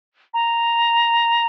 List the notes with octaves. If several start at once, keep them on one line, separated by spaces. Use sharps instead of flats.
A#5